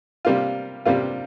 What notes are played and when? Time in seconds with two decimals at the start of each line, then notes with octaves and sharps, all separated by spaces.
0.25 C3 G3 A#3 F4
0.85 C3 G3 A#3 F4